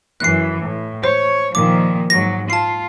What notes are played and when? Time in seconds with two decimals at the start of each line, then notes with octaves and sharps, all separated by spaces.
0.20 F#2 E3 F#6 C7
0.62 A2
1.04 C5 C#5
1.55 A#2 D#3 F3 D6
2.10 G#2 F#3 A#6
2.50 F4 A5 C7